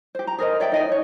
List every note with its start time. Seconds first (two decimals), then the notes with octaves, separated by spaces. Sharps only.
0.15 G4 C5
0.27 A#5
0.38 G#4 A#4 C5 D#5
0.60 C#5 D5 E5 G5
0.72 D#4 D#5 G#5
0.89 D#4 C#5